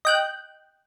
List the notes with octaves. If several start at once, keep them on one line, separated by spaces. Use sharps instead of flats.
D#5 G5 F#6